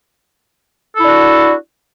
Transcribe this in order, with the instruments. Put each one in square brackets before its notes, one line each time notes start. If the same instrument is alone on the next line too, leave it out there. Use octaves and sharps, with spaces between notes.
[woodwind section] A4
E4
D4
F#4